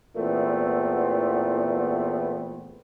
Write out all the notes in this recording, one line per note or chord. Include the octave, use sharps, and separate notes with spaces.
E2 A#2 E3 A3 B3 C4